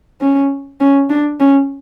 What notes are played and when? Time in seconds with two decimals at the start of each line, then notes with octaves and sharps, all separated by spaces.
0.21 C#4
0.81 C#4
1.10 D4
1.40 C#4